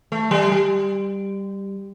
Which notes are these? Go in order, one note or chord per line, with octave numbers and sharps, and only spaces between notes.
A3
G3
G3